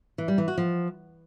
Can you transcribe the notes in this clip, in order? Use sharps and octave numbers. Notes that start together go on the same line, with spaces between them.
E3
G3
E3
F#4
F3